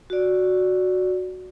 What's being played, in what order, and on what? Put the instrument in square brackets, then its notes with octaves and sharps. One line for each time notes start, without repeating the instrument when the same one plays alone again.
[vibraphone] F#4 D5